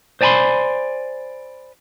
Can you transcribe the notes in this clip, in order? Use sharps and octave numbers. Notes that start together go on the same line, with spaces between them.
C5 D5 G#5 A5 B5 C6